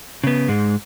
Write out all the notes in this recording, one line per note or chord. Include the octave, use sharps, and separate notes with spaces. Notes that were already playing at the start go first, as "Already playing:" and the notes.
C#3 B3
G#2 G#3